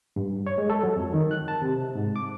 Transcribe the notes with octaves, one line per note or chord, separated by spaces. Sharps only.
G2
C#5
G#3
A4
F#3
F2
D#3
F#6
A5
C3
G#2
D6